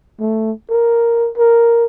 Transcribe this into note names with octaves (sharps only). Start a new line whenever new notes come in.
A3
A#4
A#4